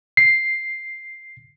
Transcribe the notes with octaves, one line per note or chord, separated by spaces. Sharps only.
C7